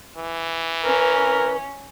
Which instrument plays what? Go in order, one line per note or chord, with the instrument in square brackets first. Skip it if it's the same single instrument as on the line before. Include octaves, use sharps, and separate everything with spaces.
[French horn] E3
[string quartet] C#4 [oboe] A#4 [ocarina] B4